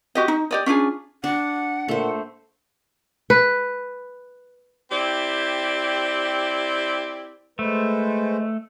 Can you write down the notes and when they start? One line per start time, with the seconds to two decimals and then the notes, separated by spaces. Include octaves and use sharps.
0.15 F#4 G4 D#5
0.28 D#4
0.51 G4 D5 D#5
0.66 C#4 D4 F4 G#4
1.24 D4 F#5
1.88 A#2 A3 C5
3.30 B4
4.90 C4 E4 G4 D5
7.59 G#3 A3 B4 C5